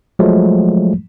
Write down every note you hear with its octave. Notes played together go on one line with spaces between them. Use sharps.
F3 F#3 G#3 A3